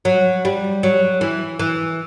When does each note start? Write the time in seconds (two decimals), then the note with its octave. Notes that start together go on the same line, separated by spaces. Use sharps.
0.05 F#3
0.45 G3
0.83 F#3
1.21 E3
1.59 E3